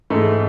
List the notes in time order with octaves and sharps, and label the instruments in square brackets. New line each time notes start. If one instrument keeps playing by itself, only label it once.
[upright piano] G#2 E3 A3